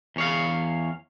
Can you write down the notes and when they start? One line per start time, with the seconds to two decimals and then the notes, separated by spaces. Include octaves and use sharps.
0.16 E2 C#5 F5